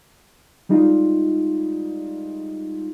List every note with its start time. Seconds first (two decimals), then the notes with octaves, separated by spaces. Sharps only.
0.69 G3 G#3 D#4 F4